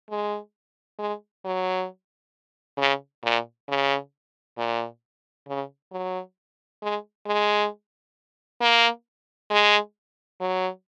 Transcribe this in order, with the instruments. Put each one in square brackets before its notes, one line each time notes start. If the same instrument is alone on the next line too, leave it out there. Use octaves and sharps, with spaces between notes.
[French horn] G#3
G#3
F#3
C#3
A#2
C#3
A#2
C#3
F#3
G#3
G#3
A#3
G#3
F#3